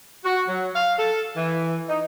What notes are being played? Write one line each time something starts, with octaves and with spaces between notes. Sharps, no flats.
F#4
F#3
F5
A4
E3
D#4